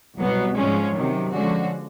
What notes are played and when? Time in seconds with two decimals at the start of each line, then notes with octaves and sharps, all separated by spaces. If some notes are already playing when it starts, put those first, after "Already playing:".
0.18 C2 B2 F#3 B3
0.56 G#2 F3 G#3 C#4
0.94 C3 D#3 F#3
1.32 D3 F3 G#3 C#4 F#4